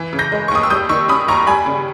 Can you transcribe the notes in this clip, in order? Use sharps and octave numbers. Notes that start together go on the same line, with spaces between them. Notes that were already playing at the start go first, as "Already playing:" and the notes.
Already playing: E3
C#3
G6 A#6
G#3
C#6
D#2 D#6
E6
G3 D#6 G6
D#3 C#6 E6
C#4 B5 D#6
D#2 A#5 C#6
G3 G#5 B5
C#3